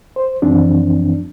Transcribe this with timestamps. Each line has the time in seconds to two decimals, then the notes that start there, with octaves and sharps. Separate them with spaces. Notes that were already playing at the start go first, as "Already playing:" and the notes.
0.16 C5
0.42 F#2 E3 F3 C4 D4